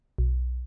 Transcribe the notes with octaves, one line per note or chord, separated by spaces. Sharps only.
B1